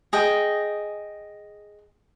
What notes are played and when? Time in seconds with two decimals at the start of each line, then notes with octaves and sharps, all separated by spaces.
0.13 G#4 D#5 G5